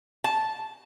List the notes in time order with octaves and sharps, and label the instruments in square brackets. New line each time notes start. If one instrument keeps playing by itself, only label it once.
[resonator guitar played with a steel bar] A5